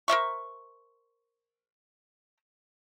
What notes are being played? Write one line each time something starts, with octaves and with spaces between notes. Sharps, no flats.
A#4 C5 E5 C#6